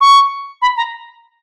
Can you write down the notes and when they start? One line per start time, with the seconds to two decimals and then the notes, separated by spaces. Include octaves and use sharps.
0.01 C#6
0.62 B5
0.77 A#5